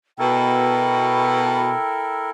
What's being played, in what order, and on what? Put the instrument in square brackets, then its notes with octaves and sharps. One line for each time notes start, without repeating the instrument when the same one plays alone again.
[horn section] B2 [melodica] E4 A4 A#4 [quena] G5